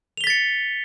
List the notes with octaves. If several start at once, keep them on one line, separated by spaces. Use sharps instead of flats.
A6 B6 C#7 F7 G7